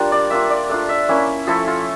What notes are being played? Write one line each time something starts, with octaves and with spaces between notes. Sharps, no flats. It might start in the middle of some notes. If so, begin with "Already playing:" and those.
Already playing: G3 D4 F4 A#4
D5
A#3 D4 F4 E5
D5
A3 D4 F4
E5
A#3 C#4 E4
F3 A3 E4 A4
F4